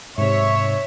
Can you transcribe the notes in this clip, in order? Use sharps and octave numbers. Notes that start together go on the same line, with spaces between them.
G#2 C3 C#5 E5